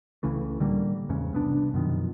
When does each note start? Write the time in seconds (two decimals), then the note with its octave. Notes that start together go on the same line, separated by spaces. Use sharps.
0.23 C#2 C#3 E3 A3
0.59 A2 D3 G3 A#3
1.09 E2 G#2 C#3
1.33 C2 B3 D4
1.74 F#2 B2 D#3 F3